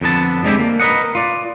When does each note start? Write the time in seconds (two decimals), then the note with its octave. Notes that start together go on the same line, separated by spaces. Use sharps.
0.01 F2 D3 B3 A5
0.45 G#3 C4 D4 E4 G4
0.59 A#3
0.80 A#4 B4 D5 D#5 F#5
1.15 F4 D5